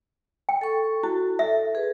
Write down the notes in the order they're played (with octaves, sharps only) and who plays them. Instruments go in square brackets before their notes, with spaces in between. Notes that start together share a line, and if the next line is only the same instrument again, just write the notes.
[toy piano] G5
[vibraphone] A4 C#6
[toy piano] E4 [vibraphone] F#4
[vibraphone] A4 [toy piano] E5
[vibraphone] G#4 B4